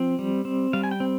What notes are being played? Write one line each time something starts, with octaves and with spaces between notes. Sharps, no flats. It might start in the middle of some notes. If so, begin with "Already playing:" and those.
Already playing: F3 C4
G3
C4
G3 F5
G#5
G5
C4